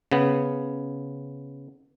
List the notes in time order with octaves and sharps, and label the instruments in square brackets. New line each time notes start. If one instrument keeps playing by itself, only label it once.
[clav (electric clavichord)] C#3 B3